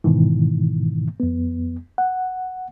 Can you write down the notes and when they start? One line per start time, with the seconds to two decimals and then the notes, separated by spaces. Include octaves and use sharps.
0.04 G#2 B2 D#3 E3
1.20 F2 B3
1.98 F#5